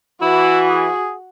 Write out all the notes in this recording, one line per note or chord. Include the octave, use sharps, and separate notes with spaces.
E3 E4 F#4
G#4